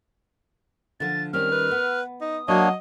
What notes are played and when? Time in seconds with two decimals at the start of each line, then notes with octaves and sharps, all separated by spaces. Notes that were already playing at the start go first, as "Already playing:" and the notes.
1.00 D3 F3 A6
1.33 D#3 G3 C4 C#4 F6
1.52 B4
1.71 B3
2.21 D#4 D#6
2.48 F#3 A#3 D4 F#4 C#5 D#5